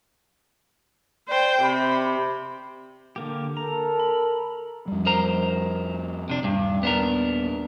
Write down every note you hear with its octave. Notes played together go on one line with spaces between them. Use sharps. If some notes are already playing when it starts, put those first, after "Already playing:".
C5 D5 G5
C3 B5
D3 A#3 G4
A4 A#4 A#5
B5
F2 G3
A#4 C5 A#5
C3 D4
D#1 G2
B3 D4 A#4